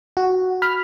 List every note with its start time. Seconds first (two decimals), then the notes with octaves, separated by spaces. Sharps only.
0.17 F#4
0.62 B5 F6